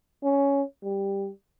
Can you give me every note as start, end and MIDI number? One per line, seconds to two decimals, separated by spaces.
0.23 0.62 61
0.83 1.29 55